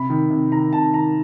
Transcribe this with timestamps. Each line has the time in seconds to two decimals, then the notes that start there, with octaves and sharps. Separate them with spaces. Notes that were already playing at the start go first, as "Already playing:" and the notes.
Already playing: C3 B5
0.10 D#3
0.31 C3
0.51 D#3 A#5
0.73 C3 A5
0.93 D#3 A#5